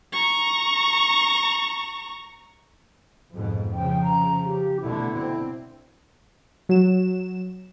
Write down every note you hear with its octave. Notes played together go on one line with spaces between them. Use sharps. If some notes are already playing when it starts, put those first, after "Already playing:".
A#5 C#6
F2 G#2 B2
C#3 F3 G5
A#5
G4
B2 D3 A3 E4
C4
F#3 E7